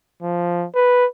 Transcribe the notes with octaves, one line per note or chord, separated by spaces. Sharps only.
F3
B4